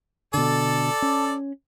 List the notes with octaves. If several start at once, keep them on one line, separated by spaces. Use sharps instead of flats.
B2 D3 A4 D5
C#4